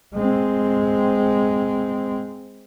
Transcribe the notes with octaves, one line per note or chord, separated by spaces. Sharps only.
G#3 C4